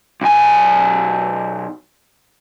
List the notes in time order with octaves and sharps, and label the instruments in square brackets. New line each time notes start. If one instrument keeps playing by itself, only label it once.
[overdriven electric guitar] B1 G#5